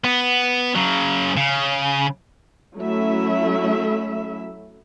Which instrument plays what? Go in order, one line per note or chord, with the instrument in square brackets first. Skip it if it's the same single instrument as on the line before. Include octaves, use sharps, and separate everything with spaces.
[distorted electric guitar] B3
C#3 F#3
C#3
[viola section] F#3 A3 C#4 E4 E5